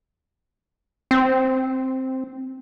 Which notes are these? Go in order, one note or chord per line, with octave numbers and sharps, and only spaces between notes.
C4